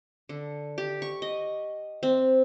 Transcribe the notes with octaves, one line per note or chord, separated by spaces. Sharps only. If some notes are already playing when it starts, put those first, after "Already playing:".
D3
G4
C#6
D#5
C4